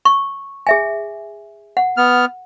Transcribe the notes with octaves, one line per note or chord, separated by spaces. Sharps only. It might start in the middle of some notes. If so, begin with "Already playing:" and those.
C#6
G#4 E5 G#5
F#5
B3 F6